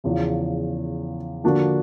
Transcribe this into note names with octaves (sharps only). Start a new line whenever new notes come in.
E2 C#3 F3
D3 F3 A#3 D4 F#4